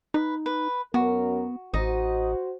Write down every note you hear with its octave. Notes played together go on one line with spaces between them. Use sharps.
D#4 B4
B4
F#2 B3 F#4 A#4
A1 D#4 F#4 C5 D#5